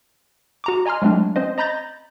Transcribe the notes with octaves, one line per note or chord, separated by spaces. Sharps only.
F#4 A#5 D6
D#5 G#5 A#5 C6 F6
F#3 G#3 A3 C4 D4
C4 C#4 C5 D#5
D#5 A#5 B5 G6 A6 A#6